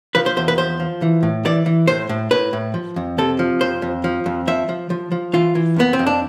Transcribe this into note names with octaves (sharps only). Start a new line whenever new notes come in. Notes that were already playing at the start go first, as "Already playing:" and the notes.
F3 B4
C5
E2 C5
B4
F3 C5
F3
E3
A2
E3 D5
E3
A2 C5
A2
A2 B4
A2
F3
F2
C3 A4
F3
F2 C5
F2
F3
F2
F3 E5
F3
F3
F3
E3 F4
E3
F2 B3
C4
F2
D4